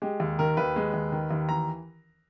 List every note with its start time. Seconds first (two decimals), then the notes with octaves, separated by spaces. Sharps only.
0.02 G#3 G4
0.20 D#2
0.39 D#3 A#4
0.57 D#2 B4
0.76 G#3
0.94 D#2
1.12 D#3
1.31 D#2
1.49 E3 A#5